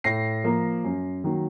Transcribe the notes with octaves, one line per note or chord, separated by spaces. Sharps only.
A2 A#6 C7
F3 A#3
F#2
D#3 F#3 A#3